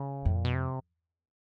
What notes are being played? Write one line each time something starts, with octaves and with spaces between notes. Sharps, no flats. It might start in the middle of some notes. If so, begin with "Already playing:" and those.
Already playing: C#3
F2 A2
A#2
B2
C3